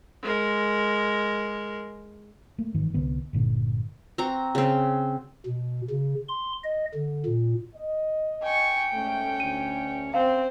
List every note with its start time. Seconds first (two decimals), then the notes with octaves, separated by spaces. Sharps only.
0.23 G#3 A#4
2.58 A3 A#3
2.74 F#1 G#2 D#3 E3
2.94 C2 D3 B3
3.33 G1 A#2 D3
4.18 C4 F#4 A#5
4.55 C#3 C4
5.46 B2
5.90 C#3
6.28 C6
6.64 D#5
6.94 D3
7.26 A#2
7.75 D#5
8.43 G5 G#5 C#6
8.93 G#2 A3 C#4
9.40 D2 D#7
10.14 C4 C5 F5